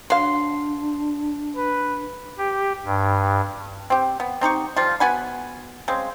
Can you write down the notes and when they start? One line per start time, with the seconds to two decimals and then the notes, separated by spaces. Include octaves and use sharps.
0.10 F#3 D4 F5 C6
1.57 B4
2.38 G4
2.85 G2
3.90 C4 G4
4.20 B3
4.41 C4 D#4 G4 C#6
4.76 F3 G3 F4
5.00 B3 F#4 G#5 B5
5.88 C#3 G#3 C4